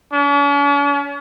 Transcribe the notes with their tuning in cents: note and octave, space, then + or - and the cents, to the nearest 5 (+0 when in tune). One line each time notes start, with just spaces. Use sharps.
C#4 +45